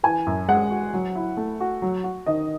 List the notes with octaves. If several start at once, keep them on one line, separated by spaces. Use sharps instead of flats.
E3 G#5
F#2
G#3 F#5
F#4
F#3
E4
A3
F#4
F#3
F#4
D#3 D#5